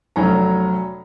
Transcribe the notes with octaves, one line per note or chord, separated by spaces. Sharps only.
F1 F#3 C#4 C#5 A#5